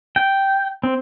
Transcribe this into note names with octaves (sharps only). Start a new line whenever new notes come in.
G5
C4